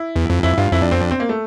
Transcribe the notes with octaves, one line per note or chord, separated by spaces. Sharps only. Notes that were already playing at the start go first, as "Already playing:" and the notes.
Already playing: E4
E2
F2
F2 E4
G2 F4
F2 E4
D4
C4
D4
C4
A#3
A3